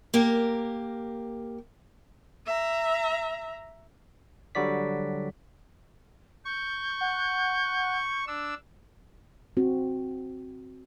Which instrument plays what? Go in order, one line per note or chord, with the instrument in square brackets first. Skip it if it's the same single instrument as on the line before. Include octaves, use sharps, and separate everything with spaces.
[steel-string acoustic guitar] A#3 G4 A#4
[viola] E5 A#5
[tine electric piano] D3 F#3 G3 F#4 D5 B6
[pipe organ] C#6 [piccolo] G6
[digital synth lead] F#5
[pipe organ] D4 E6
[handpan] C4 F#4